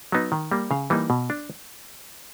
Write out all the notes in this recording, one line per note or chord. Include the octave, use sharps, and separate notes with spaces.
F#3 B3 D#4
D#3
G3 A#3
C#3 F5
E3 G3 A#3 D#4
B2
D4